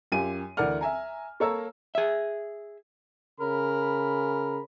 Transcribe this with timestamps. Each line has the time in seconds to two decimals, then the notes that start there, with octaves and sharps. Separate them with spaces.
0.12 F#2 F4 G4 G#5 D#7
0.57 D2 E3 A#4 D5 F#5 F6
0.81 E5 G#5 A#5
1.40 A#3 A4 C#5 A#5 E6
1.95 G#4 E5
3.40 C#3 A#4 B5